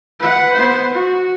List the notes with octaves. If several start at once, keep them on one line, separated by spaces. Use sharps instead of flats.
B4 F#5
B3 C5
F#4